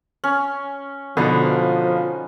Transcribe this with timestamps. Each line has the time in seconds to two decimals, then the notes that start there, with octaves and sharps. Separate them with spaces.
0.24 C#4
1.17 B2 D3 F3 B3 D#4